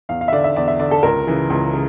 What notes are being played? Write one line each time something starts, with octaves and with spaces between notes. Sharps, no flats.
E2 F5
F5
E5
D3 D5
E5
E2 D5
E5
D3 D5
A4
C#2 A#4
C#3 E3
C#2
C#3